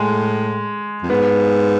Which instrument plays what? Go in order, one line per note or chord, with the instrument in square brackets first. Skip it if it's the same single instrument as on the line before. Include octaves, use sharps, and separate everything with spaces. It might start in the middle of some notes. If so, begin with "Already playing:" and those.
Already playing: [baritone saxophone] A2 [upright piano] G#3
[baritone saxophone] F2
[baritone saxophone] G#2 [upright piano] B3